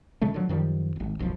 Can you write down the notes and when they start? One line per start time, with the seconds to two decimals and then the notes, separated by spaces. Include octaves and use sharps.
0.21 A#2 C#3 G#3 A3
0.34 D3 F3 F#3
0.49 F#2 D#3 F3 G3
0.96 D#1 G#1
1.19 D1 B1 F#2 F3